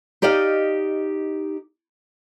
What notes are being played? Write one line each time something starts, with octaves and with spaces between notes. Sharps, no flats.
D#4 G4 D5 D#5 F5